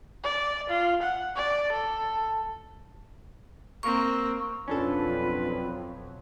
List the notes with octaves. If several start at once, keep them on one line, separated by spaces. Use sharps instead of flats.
D5
F4
F#5
D5
A4
A#3 C4 C#6
F2 B2 F#3 C#4 D4 F4 A4 B4